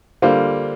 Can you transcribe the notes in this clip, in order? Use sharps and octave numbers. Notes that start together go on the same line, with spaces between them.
D3 G3 A#3 F4 C5